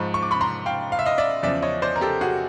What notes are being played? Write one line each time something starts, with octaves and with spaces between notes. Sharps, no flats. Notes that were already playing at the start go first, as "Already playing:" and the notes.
Already playing: G#2 F3 B5 C#6
C#6
D6
B5 C#6
A#5 C6
F5 G5
F5
E5
D#5 F5
D5 E5
E2 C#3 F3 D5 E5
C#5 D#5
C5 D5
A#4
G4 A4
F#4 G#4